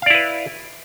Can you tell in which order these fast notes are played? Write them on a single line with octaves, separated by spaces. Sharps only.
F5 D5 E4 B4